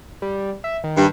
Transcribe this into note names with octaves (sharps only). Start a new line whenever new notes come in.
G3
E5
D#3
G2